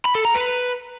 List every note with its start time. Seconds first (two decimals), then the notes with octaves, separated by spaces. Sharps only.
0.05 B5
0.15 A4
0.25 A#5
0.35 B4